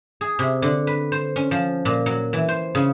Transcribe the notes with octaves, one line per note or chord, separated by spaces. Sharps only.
G#4
C3
D3
B4
C5
C#4
F3
A#2
F#3
E3
C5
C#3